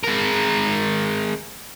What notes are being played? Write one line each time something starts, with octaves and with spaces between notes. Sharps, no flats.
G#3 A#4